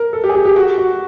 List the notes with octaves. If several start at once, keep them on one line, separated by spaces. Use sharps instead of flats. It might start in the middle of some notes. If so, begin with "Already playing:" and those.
Already playing: A#4
A4
G4
G#4
G4
G4
F#4
F#4